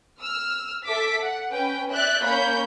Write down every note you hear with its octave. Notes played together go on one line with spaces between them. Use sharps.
E6 F6
A4 E5 D6 B6
F#5
C#4 B4 G5
D5 E5 F#6 G6
A#3 C#4 C#5 B5 G6